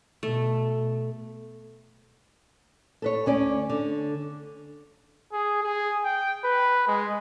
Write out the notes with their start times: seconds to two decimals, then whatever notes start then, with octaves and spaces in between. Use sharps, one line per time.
0.23 B2 A3
3.02 A4 B4 C#5
3.26 D2 C#4 D5
3.70 D3
5.33 G#4
5.63 G#4
6.04 G5
6.44 B4
6.88 G#3